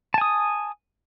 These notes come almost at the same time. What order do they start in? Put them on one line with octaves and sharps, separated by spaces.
A5 G#5 D#6